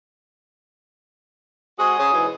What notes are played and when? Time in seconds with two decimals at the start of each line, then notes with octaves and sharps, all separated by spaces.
1.79 G#3 C4 F#4 G#4 D#6
1.98 C#3
2.12 G#2 B2 E3